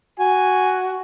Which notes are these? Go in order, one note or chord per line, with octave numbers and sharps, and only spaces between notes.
F#4 G#5